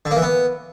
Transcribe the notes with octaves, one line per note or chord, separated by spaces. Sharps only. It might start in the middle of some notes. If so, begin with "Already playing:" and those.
D3
A#3
E3
B3